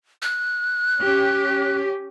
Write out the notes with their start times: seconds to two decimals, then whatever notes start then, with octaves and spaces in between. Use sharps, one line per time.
0.22 F#6
1.00 C#4 G4